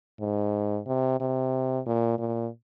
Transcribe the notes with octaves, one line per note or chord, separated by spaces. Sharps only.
G#2
C3
C3
A#2
A#2